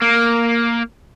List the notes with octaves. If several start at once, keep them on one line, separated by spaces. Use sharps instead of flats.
A#3